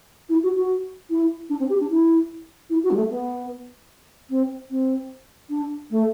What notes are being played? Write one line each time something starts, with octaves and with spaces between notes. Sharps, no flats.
E4
F#4
F#4
E4
D4
C4
G4
D4
E4
E4
F#4
G3
A3
B3
C4
C4
D4
A3